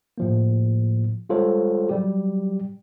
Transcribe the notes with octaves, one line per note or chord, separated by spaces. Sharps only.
A2 F3 A#3
G3 G#3 F4 A4 C5 C#5
F#3 G3 G4